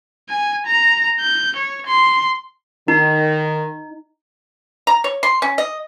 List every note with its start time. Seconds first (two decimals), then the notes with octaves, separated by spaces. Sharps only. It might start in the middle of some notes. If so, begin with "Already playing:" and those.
0.30 G#5
0.66 A#5
1.20 G6
1.56 C#5
1.87 C6
2.88 D#3 D#4
4.87 A#5
5.04 C#5
5.23 C6
5.42 C#4
5.58 D#5